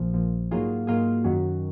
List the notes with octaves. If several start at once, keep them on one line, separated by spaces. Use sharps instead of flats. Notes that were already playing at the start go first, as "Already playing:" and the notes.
Already playing: A#1 A#2 F3
A#1 A#2 F3
G#2 F#3 A#3 F4 G#4
G#2 F#3 A#3 F4 G#4
F#2 D#3 F#3 C#4